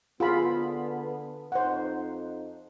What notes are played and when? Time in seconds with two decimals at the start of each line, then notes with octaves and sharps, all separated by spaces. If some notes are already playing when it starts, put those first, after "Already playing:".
0.20 D3 B3 F4 G#4 B5
1.52 F2 D#4 C5 F#5